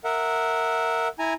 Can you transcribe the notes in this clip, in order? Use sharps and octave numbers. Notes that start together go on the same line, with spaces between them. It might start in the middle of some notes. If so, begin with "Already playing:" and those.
A#4 E5 F#5
E4 G#5 A#5